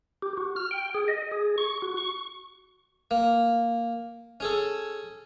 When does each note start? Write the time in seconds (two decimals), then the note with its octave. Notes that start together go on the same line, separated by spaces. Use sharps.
0.22 G4
0.37 F#4
0.56 F6
0.71 G5
0.95 G#4
1.08 D#5
1.31 G#4
1.58 C#6
1.82 F#4
1.97 C#6
3.11 A#3
4.40 C#4 G#4 A4